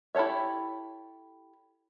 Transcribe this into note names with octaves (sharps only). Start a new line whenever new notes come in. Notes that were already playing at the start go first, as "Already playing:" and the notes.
E4 G4 A4 C#5 E5